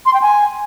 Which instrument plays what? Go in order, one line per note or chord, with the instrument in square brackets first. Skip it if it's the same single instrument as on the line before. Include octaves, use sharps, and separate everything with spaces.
[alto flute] C6
G5
G#5